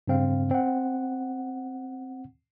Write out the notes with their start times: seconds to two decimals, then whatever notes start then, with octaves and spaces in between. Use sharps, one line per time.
0.08 G2 C#3 C4 F5
0.51 C4 F#5